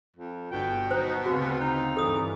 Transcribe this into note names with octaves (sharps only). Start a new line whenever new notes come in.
F2
G1 B2 D3 G5
F#3 D#4 C5 A#5
D2 C#3 C4 F4 F#4
D#4
G2 E3 A4 D#6